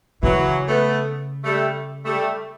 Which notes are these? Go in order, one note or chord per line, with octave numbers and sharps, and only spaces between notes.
C#3 E3 F#3
A3 B3
G3 A3
G3 A3